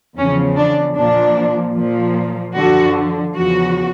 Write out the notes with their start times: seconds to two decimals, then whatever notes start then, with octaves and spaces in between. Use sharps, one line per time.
0.17 E2 C#3 F3 C#4
0.57 D4
0.97 A#2 F3 D4
1.76 A#2 F3
2.56 F#2 D3 F3 F#4
3.36 E2 C#3 F3 F#4